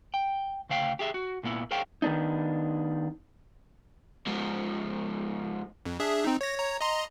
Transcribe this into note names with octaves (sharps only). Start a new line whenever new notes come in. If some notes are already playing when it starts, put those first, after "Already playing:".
G5
D2 C#3 C5 F5 G5
G4 G#4 E5
F#4
A#2 A#3 B3 E4
G#4 A#4 C5 C#5 F5 G5
D#3 B3 D4 D#4
G#2 F3
F2
D4 G#4 E5
C4 D#4
C#5 A#6
C#5 A#5
D#5 A#5 C6